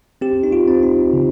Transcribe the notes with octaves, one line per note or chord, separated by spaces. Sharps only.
C4 G4
D#4
F4
C4
D#4
C#3